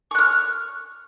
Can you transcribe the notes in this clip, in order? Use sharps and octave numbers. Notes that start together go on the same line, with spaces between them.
C#6 F6 F#6